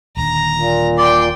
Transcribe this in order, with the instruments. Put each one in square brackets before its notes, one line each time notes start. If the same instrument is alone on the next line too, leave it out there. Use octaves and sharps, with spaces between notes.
[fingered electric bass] D#1 D#2 D3 [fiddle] A#5
[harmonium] A#2
[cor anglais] D5 [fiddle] G5 C6